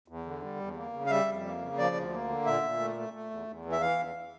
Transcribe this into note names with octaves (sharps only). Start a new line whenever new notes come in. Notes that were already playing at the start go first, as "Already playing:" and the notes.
E2
D3
G3
E2
A#3
C#3
F5
G3 E5
F2
A#3
C#3
F3 D5
D2
A#3
D3
A#2 E5
A#2
A3
A3
A3
E2
E2
E3
E5
E3 F5
E2